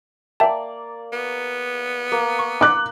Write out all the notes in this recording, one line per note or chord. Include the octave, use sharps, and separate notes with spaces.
A#3 D5 E5 G5 A5
B3
A#3
C#6
D6 F#6